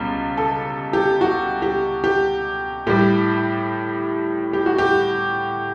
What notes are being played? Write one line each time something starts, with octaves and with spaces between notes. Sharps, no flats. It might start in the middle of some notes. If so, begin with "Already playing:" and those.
Already playing: C#2 B2 G3
A4
G4
F#4
G4
G4
A2 G3 G4
G4
F#4
G4